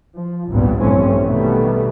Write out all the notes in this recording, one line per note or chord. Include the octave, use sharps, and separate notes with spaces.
F3
G#1 C#2 G2 A#2 G3 B3
A#1 G2 E3 A3 C4 C#4
B2 D#3 G3 A3 B3